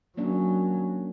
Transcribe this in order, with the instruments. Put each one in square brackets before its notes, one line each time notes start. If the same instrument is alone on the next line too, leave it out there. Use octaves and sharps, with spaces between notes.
[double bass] F#3 [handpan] A#3 C#4 D4